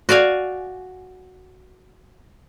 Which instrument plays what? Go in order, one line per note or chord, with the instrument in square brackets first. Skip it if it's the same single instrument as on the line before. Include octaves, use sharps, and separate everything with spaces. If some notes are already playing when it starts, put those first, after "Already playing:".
[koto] F#4 D5 F5 G#5